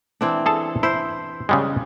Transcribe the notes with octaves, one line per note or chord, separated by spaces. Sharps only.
E3 C4 D4
G#4 A4 A5
E4 C5
C#3 G3 G#3